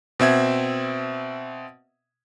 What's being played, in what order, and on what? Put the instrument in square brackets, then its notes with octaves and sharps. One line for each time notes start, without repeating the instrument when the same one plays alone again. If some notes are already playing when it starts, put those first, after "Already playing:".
[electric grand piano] B2 C4 E5 G#6